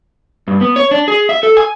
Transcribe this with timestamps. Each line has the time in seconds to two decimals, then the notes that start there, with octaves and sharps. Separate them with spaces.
0.48 G2
0.61 B3
0.76 C#5
0.91 D4
1.08 G#4
1.29 E5
1.43 A4
1.57 G#5